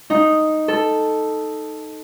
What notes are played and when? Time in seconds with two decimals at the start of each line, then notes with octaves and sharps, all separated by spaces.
0.10 D#4
0.68 A4